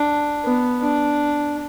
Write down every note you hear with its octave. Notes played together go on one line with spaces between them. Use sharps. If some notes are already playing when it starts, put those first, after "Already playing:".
Already playing: D4
B3
D4